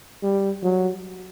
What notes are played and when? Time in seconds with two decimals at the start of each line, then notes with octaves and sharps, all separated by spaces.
0.23 G3
0.63 F#3